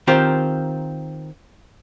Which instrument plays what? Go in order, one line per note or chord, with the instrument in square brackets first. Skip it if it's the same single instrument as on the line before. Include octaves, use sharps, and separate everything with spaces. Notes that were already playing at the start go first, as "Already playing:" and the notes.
[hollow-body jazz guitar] D#3 C4 F4 G4 A#4 C5